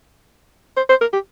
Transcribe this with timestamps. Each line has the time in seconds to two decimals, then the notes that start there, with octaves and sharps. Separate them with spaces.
0.77 C5
0.89 C5
1.01 A#4
1.13 G4